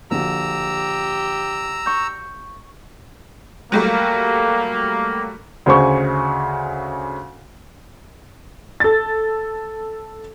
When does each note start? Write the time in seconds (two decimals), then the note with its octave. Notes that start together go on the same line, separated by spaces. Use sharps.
0.11 A#1 D3 F#4 G4 A#5 E6
1.86 C#6 G6
3.72 F#3 G3 A3 A#3
5.66 D2 C#3 C5 G#5 C#6
8.80 A4 A6